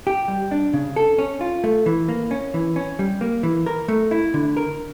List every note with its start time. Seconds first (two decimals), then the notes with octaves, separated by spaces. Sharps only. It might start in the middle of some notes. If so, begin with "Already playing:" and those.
0.07 G4
0.28 G3
0.51 D4
0.73 C#3
0.96 A4
1.18 C#4
1.41 F4
1.64 A3
1.86 E3
2.08 A#3
2.31 C#4
2.54 E3
2.76 C#4
2.99 G3
3.21 A#3
3.43 E3
3.66 A#4
3.88 A3
4.11 E4
4.34 D3
4.57 A#4